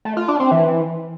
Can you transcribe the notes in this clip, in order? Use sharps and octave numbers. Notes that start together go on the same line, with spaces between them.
A3
F4
D4
C4
E3